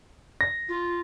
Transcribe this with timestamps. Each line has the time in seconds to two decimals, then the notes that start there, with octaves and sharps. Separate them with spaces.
0.41 A#6
0.69 F4